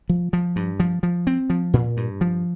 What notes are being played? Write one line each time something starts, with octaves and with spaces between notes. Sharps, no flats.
F3
F3
G2
F3
F3
C4
F3
A#2
G2
F3